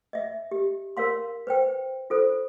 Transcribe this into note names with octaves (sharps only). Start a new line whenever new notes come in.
D#5 E5
G4
A#4 C#5 F5 C6
B4 C5 G5
F4 A4 C5